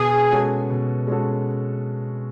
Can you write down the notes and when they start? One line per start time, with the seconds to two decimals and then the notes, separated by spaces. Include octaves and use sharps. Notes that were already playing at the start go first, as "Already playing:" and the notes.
Already playing: B2 G#4
0.31 G#3 C#4 F#4 A4
0.70 B2
1.07 G#3 C#4 F#4 A4